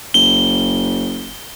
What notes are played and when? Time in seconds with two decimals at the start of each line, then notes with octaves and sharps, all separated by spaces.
0.14 F#1 G7